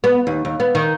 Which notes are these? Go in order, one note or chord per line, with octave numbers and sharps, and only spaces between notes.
B3
D#2
D#2
B3
D#3